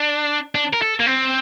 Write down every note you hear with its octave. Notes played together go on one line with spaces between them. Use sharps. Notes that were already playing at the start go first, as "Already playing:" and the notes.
Already playing: D4
D4
A#4
A4
A#3
C4